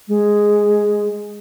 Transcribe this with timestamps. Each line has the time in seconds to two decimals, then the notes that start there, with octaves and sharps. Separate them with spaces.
0.08 G#3